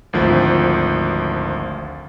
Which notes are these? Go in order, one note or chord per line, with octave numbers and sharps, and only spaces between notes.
G#1 D2 F3